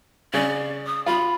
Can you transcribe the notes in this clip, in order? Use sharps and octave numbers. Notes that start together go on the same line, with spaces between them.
C#3 D5
D#6
F4 B5